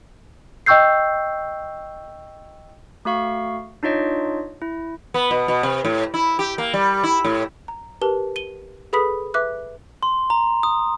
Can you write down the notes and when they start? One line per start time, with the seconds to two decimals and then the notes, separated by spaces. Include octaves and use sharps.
0.66 D#5 G5 C#6 E6 G6 C7
3.05 A3 F#4 F5 C#6
3.83 D4 D#4 F4 C#5 D#5
4.62 E4
5.14 B3
5.31 B2
5.48 B2
5.63 C3
5.85 A2
6.14 E4
6.39 G4
6.58 A#3
6.74 G3
7.04 E4
7.24 A2
7.68 A#5
8.01 G4 A#4 B4 A5 G7
8.36 D#7 G7
8.93 G#4 A4 B4 B5 D#6 B6
9.34 B4 E5 D6 F#6
10.03 C6
10.30 A#5
10.63 D#6